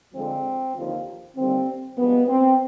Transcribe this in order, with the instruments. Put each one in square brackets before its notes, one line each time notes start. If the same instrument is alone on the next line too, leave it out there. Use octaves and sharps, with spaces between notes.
[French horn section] F2 D3 F3 G#3 C4
D#2 D3 F3
D#2 D3 G3 C4
G2 F3 G#3 B3
C4